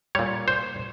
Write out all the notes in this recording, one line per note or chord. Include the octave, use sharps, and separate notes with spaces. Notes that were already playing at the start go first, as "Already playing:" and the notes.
A#2 G3 C#5
C5